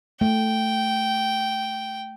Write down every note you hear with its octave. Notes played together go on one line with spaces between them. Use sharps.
A3 G5